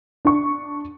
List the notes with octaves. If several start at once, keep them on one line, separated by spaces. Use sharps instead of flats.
D4 C#6